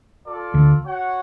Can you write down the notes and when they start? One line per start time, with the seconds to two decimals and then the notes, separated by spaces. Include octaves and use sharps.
0.24 F4 A4 D5
0.54 D2 D3
0.85 F#4 C#5 F#5